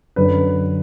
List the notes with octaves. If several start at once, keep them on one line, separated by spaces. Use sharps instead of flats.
F#2 D3 B4